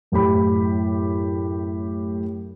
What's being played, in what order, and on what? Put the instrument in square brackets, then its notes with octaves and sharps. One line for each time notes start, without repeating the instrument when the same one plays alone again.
[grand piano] F#2 A2 G4 B5